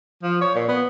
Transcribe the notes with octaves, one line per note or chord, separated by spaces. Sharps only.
F3
C#5
A#2
B3